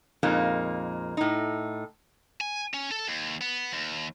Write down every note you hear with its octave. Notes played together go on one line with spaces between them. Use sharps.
F2 A#2 G#3 A#3 D#4
A2 D#4
G#5
C#4
A4
D#2
B3
D#2